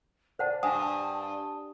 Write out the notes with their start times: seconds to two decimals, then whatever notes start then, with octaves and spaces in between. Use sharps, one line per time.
0.39 C5 D5 F#5 A5
0.63 G2 F#5 G#5 A5 D#6